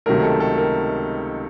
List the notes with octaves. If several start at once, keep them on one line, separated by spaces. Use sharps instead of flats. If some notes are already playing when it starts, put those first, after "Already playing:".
C#2 C3 D#3 F#3 A3 A#4
A4
A4
A#4